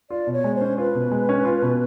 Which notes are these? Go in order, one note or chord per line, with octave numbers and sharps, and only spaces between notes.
F4 D5
B2
C#5
G#3
C5
C#4
F4 B4
B2
G#3
C#4
F4
B2